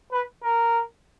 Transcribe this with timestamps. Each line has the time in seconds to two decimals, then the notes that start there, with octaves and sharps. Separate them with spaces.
0.12 B4
0.43 A#4